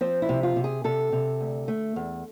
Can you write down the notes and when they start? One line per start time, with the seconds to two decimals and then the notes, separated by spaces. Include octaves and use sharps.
0.01 F3 C4
0.22 E4
0.29 C3
0.43 F4
0.56 C3
0.64 G#4
0.84 C3 A4
1.12 C3
1.40 D2
1.68 A3
1.96 E2